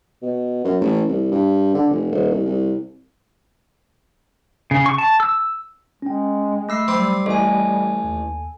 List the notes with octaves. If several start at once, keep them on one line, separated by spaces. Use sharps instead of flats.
B2
F#2
A1
C2
G2
D3
F1
D#1
C2
C2
C#3
C#6
A5
E6
G#3 C#4 G5
A3 D#5 E6 C7
F#3 G3 C4 B5 D6 C7
A1 A4 D#5 G#5
D#2